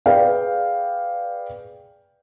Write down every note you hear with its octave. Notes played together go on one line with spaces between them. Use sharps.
G#4 B4 D5 F5 G5